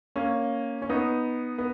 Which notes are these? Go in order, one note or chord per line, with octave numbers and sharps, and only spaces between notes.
A#3 C#4
C#4
B3 D#4
B3